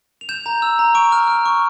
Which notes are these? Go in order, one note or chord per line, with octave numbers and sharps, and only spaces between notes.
F7
G6 E7
A#5
E6
A#5
C#6 D7
F6
F6
C#6